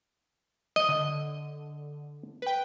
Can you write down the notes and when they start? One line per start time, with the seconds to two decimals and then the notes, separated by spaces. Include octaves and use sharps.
0.76 D#5
0.89 D3
2.42 B4 G5